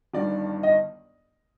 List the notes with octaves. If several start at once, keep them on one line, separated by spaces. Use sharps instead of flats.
G1 G2 D#3 D5
D#5